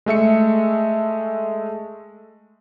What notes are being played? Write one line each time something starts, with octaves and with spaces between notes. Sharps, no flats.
G#3 A3 E5 C#7